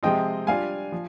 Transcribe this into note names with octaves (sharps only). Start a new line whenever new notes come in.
C3 F3 G#3 C4 F4 D#5 G5
G3 D4 F4 F5 G#5
F3